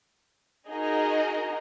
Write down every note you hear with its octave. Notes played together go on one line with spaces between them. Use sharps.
D#4 F#4 G#4 A#4 D#5